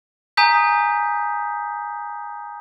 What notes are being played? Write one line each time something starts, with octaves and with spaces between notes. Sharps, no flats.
G#5 A#5 D#6 G6 B6